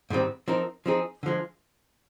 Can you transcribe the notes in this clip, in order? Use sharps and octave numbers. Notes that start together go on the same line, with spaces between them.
G#2 D#3 G3 C4
F3 C4 D#4 A#4
F3 C4 D#4 G#4
D3 F3 G#3